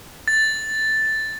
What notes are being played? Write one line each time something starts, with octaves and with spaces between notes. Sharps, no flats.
A6